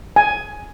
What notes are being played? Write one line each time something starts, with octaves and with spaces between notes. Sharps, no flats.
G#5